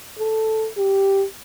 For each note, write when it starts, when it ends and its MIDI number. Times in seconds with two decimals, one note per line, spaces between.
0.19 0.68 69
0.77 1.25 67